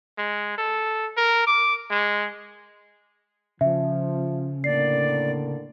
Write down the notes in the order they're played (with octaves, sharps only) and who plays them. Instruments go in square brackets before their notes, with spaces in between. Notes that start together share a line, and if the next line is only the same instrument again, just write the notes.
[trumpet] G#3
A4
A#4
D6
G#3
[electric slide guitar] C#3 [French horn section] F3 [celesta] E5
[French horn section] A2 D3 A#3 [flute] D5 [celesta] C7